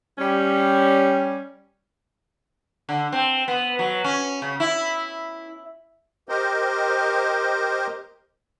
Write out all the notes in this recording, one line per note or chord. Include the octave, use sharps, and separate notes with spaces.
G3 C#4
D3
C4
B3
F#3
C#4
C#3
E4
G4 A#4 C5 D#5